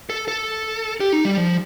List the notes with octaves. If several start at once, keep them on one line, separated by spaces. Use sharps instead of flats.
A4
A4
G4
D#4
G3
F3